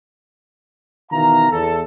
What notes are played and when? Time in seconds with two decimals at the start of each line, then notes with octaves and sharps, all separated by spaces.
1.11 B2 D#3 E3 F5 A#5
1.51 E2 A4